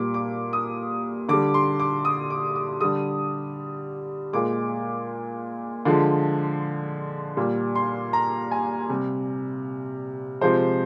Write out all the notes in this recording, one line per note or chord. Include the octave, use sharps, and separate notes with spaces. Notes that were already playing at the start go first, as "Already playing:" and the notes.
Already playing: A#2 G3 D6
D6
D#6
D3 G3 D6
C6
D6
D#6
D6
D#6
D3 G3 D#6
A#2 G#3 D6
D3 F3 G#3
A#2 G3
C6
A#5
G#5
C3 G3
C3 F3 G#3 C5